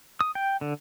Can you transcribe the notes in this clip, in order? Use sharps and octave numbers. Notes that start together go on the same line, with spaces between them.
D#6
G5
D3